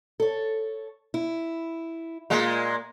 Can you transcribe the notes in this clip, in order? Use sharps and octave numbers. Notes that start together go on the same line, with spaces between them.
A4 C#5
E4
A#2 G#3 A#3